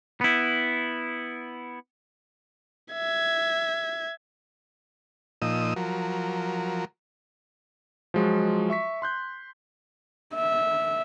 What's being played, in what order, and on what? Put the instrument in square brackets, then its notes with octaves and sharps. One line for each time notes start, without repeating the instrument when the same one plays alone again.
[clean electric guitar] B3 E4
[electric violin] E5 G#6
[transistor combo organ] A#2 F3 D#4 D#6 E6
F3 F#3 A#4
[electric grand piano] F3 F#3 G#3 F4 F#4
E5 C#6 B6
C6 F#6 G6
[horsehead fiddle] E5